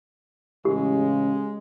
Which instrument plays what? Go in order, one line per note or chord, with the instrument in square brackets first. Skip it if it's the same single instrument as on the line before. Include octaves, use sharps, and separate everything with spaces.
[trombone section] A1 C#3 [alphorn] G#3 [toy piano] G4